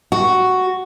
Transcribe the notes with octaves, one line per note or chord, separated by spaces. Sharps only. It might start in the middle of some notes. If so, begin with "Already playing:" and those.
F#4